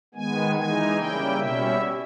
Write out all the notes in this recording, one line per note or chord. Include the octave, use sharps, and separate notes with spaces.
D#3 G#3 B3 G#5
E3 G#3 D#4 G#5
C#3 G3 A#3 E4 G5
B2 G3 C#4 E4 E5